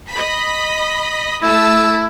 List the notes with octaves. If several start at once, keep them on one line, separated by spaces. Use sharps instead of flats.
D#5 B5 B6
A3 E4 A5 E6